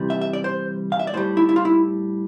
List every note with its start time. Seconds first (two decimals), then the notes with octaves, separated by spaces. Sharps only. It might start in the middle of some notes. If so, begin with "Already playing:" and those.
Already playing: C3 E3 G3
0.10 E5
0.21 E5
0.33 D5
0.44 C5
0.92 F5
0.99 E5
1.07 D5
1.14 A2 C5
1.17 G3
1.37 E4
1.49 E4
1.56 F4
1.65 E4